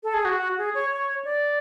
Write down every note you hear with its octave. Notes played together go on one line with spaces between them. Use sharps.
A4
G#4
F#4
G#4
C#5
C#5
D5